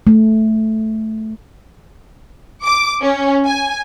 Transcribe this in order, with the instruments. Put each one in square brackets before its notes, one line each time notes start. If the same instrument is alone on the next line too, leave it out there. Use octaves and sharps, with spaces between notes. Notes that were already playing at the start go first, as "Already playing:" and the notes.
[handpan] A3
[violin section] D6
C#4
G#5